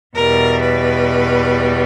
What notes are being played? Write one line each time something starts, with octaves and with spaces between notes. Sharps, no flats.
E2 B2 G3 A#4
B4